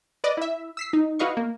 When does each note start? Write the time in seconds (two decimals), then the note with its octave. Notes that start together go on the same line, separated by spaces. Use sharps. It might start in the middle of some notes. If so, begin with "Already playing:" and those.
0.24 B4 D5 D#5
0.37 E4 E5
0.77 E6 B6 C7
0.93 D#4
1.19 E4 F#4 B4 D#5 F5 C#6
1.37 A#3